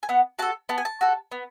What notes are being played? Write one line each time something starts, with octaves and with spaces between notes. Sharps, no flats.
G#5
B3 F#5
F#4 A4 A5
B3 A5
G#5
A5
F#4 A4
B3